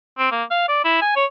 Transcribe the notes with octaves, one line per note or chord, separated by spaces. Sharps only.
C4
A#3
F5
D5
E4
G#5
C#5